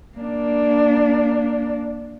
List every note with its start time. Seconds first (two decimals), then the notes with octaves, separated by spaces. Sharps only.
0.17 A#3 D4